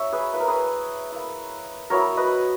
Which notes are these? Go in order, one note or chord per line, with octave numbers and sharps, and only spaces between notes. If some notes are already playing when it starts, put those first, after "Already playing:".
Already playing: D#4 C#5 E5
G#4 B4
A#3 E4 B4
A#4
G#4 B4
A#3 E4
F#3 B3 E4 A#4 C#5
B4 D#5